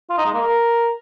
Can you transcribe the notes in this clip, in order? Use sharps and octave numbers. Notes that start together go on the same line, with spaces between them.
F4
D#4
G#3
A#3
A#4